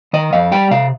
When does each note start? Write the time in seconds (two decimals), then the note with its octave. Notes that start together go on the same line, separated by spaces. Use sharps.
0.13 D#3 D#5
0.33 F2 F5
0.52 G3 G5
0.71 C3 F5